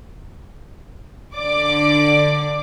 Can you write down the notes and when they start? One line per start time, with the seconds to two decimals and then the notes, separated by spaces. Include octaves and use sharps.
1.36 D3 D5 D6